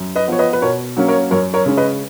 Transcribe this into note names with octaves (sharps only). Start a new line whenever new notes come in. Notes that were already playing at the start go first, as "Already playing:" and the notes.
Already playing: F#2
B4 D#5
F3 B3 C#5
B4 D#5
B4
B2 A#4 C#5
F#3 A#3 C#4
A#4 C#5
F#2 A#4 C#5
A#4 C#5
C#3 G#3 C#4
B4 D#5